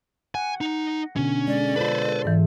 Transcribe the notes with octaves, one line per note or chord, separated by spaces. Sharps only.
F#5 G#5
D#4
B2 D3 C#4
G#3 D5
F4 A4 B4 C5
G#2 E3